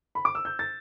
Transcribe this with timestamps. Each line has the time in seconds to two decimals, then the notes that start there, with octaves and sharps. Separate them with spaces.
0.15 B5
0.25 D6
0.35 E6
0.45 G6
0.59 A6